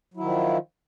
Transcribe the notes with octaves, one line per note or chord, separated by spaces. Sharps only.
D#3 F3 F#3 E4